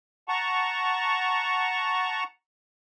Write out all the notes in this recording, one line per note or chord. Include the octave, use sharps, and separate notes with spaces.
F#5 A5 A#5 C#6